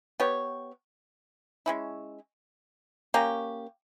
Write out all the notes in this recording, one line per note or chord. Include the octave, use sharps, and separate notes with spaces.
B3 G4 C#5
G#3 C#4 E4
A#3 C#4 G4